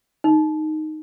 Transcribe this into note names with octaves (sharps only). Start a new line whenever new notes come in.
D#4